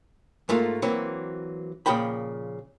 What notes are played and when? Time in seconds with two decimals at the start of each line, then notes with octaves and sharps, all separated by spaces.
0.49 G#2 A3 A#3 F4
0.82 E3 F#3 A#3 C4
1.86 A#2 C#3 F3 G5 B5